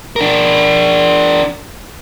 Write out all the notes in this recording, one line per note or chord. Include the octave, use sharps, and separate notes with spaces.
D4 A#4